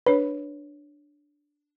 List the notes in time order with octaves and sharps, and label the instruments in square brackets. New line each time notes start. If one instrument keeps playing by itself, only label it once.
[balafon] D4 C#5 [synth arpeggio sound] B4